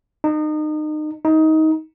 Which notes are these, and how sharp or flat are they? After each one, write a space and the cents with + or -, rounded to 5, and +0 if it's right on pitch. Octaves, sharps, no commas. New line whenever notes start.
D#4 -30
D#4 +20